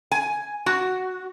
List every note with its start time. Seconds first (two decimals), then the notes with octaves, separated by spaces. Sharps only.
0.11 G#5
0.66 F#4